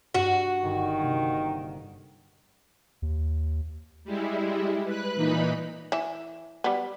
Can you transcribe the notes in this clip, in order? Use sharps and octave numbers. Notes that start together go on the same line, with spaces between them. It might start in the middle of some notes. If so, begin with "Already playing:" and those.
G2 F#4
G1 D#3
C3 A#3 A#6
D#2
G3 G#3 E4
B4 F#6
A#2 E3 D#4 B5
E3 E5
G3 B3